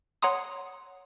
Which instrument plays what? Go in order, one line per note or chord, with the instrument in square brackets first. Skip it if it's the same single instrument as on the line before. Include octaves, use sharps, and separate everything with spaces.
[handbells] C#5 F#5 A#5 C6 D#6